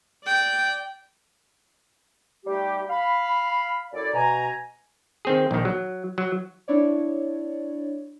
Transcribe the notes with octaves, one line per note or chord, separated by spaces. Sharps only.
D5 G5
G3 A3 D#4 G4
F5 B5
F#2 E4 A4 D5
B2 G#5 A#5
D#3 C4 G#4
A#1 D#3
F#3
F#3
D4 E4 C#5 D5